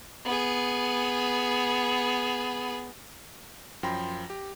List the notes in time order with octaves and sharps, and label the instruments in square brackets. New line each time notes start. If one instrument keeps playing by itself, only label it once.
[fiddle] B3 G#4
[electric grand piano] F#2 F3 G5 B5 C6 A#6
G4